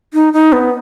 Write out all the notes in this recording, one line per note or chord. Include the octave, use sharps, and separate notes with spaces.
D#4
D#4
B3